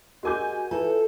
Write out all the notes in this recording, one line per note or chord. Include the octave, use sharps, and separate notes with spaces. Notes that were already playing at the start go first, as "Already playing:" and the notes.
G#3 F#4 G4 A#4 G#5 D6 G6
E3 F4 A4